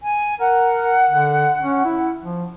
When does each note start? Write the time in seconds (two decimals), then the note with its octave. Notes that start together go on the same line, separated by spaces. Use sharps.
0.01 G#5
0.40 A#4 F#5
1.10 D3
1.61 C#4
1.85 E4
2.21 F3